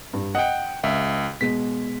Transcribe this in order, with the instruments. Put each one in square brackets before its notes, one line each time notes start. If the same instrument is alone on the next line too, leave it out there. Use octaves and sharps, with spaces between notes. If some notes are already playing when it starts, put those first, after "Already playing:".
[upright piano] G2
[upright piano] D#5 [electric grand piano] F#5 G5
[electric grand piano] C#2 [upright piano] E5
[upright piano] B2 G#3 [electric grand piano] B6